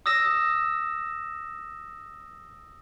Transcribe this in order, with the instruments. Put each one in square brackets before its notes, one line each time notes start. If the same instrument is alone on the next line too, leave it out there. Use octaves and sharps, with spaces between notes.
[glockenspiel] D#6 E6 A#6 E7